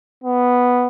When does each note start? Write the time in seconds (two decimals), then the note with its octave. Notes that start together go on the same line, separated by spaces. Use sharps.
0.24 B3